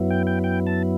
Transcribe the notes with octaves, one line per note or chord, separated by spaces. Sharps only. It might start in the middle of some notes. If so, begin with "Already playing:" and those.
Already playing: F#2 F#3 B3 E4
G5
G5
G5
A5